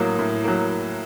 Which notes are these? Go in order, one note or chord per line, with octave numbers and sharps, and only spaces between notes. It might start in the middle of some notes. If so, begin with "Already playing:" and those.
Already playing: A2 F#3 A#3 D#6
A2
F#3 A#3